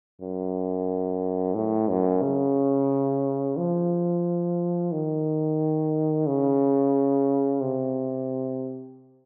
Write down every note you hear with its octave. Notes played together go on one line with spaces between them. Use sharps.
F#2
A2
F#2
C#3
F3
D#3
C#3
C3